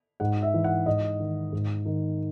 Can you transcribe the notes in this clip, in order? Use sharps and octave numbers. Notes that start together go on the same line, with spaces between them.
G#2 F#5
E5
E3
F#5
G#2 D#5
D#3
G#2
D#3